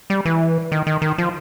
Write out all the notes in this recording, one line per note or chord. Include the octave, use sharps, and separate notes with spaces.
G3
E3
D#3
D#3
D#3
F3